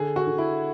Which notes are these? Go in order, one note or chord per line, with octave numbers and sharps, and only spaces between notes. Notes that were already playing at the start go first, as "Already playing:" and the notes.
Already playing: D3 G#4
F#4
D3
E4